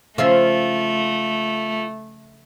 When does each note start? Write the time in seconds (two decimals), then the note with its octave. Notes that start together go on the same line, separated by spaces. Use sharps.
0.18 C#3 F3 A3 F4 E5